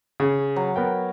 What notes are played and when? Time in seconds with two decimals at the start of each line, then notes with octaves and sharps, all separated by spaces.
0.20 C#3
0.56 F#3
0.76 B3 A#4 G5